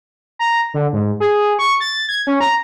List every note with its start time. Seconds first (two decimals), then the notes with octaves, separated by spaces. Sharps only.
0.39 A#5
0.74 D3
0.93 G#2
1.20 G#4
1.59 C#6
1.80 A6
2.09 G#6
2.27 C#4
2.41 A#5